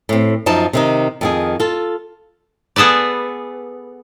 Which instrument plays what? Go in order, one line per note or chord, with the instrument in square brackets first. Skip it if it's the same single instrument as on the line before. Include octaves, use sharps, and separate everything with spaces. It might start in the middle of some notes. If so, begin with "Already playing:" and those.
[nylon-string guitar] A2 C4
F#2 F3 D#4 A5
C3 D#3 D#4
F2 D#3 G#4
F4 A4
[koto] B3 G#4 A4 B4 D5